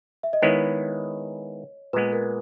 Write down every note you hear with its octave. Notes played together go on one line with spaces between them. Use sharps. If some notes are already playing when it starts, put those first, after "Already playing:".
E5
D#5
D#3 G#3 B3 E4 C#5
A#2 G#3 B3 B4
A#4